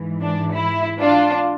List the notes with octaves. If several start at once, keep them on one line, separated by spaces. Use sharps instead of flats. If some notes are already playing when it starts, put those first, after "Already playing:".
Already playing: G#2 E3
D4
E4
D4 F4